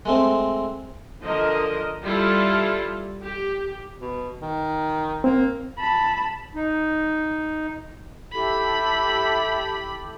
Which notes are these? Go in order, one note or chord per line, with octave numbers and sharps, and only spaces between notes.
G#3 A3 C4
D3 F3 A#4 D#5
G3 E4 F4 A4 A5
G4
B2
D#3
A#3 C4
A5 B5
D#4
E4 G4 A4 B5